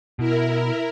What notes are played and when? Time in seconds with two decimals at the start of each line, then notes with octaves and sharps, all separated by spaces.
0.19 B2 E4 A#4